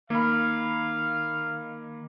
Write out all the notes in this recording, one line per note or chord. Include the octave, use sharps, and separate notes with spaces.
D#3 A#3 F5 B5